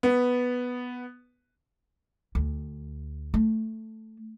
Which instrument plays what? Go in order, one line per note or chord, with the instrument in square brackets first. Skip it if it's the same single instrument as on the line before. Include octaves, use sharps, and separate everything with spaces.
[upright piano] B3
[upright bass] D2
A3